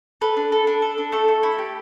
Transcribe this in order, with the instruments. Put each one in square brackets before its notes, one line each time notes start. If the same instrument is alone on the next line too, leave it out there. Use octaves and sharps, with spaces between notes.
[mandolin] A4 B4
D4
A4
D4
A4
D4
A3 A4
A3
E4
G4